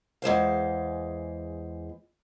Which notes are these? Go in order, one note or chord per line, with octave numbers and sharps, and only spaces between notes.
E2 G#3 C5 F5